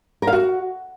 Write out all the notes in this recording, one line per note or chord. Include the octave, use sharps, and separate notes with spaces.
A#4
F5
F#4